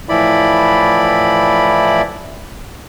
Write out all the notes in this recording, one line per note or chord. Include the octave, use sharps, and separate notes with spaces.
A2 E3 F3 E4 D5 B5